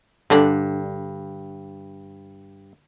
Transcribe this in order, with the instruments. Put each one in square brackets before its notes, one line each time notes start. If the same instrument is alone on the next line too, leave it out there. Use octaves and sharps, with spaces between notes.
[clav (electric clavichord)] G2 [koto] D3 D4